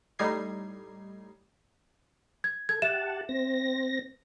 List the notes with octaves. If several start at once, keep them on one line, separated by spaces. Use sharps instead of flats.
A2 G3 D#4 G#6 C7
G#6
A4 G#6
G4 E5 F#5 A5 E7
C4 A#6